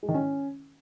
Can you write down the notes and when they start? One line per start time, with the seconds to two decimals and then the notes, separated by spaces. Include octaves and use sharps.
0.03 G#3
0.09 D#3
0.14 C#4